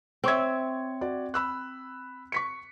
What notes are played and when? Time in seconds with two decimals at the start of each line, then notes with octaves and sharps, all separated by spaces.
0.24 C4 C#5 E5 C#6 G#6
1.01 F#4 D5
1.34 B5 E6 F#6
2.32 C#6 B6 C#7